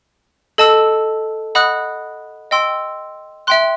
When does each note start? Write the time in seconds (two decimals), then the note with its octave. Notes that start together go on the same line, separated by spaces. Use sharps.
0.58 A4 D#5 A5 E6
1.55 D#5 F#5 B5 D#6 F#6
2.51 D#5 G5 C6 E6
3.47 E5 G5 C6 F#6